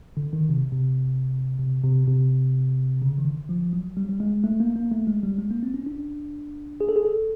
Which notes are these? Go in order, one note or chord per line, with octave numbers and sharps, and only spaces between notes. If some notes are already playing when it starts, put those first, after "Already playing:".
D3
D#3
C3
C3
C3
C3
C3
C#3
D#3
D3
F3
F#3
G3
G3
G#3
A3
A#3
A#3
A3
G#3
G3
G#3
A#3
C4
C#4
D4
G#4
A4
G#4
A4